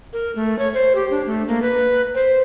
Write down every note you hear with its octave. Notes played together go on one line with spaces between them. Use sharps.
A#4
A3
C#5
C5
G4
D4
A3
A#3
B4
C5